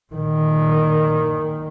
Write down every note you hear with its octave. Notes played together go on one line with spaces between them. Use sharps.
A#2 D#3